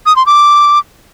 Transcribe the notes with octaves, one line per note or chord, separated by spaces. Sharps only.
D#6
C6
D6